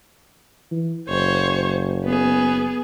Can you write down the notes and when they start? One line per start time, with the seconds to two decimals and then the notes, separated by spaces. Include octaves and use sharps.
0.72 E3
1.08 F#1 C5 C#5
2.04 B3 G#4